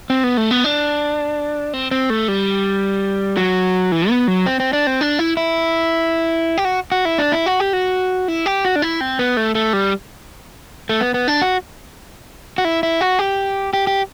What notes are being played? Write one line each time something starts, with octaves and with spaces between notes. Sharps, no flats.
C4
B3
A3
B3
D4
C4
C4
A3
G3
F#3
E3
B3
F#3
C4
C4
D4
C4
D4
E4
E4
G4
F#4
F#4
E4
D4
E4
F#4
G4
F#4
E4
G4
F#4
D4
E4
C4
B3
A3
A3
G3
A3
B3
B3
D4
F#4
F#4
E4
E4
F#4
G4
G4
G4